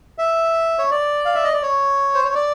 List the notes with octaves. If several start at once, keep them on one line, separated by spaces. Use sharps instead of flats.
E5
C#5
D5
F5
E5
D#5
D5
C#5
C5
C#5
D5